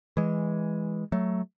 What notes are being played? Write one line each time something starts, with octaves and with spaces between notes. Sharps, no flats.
E3 G#3
F#3 A3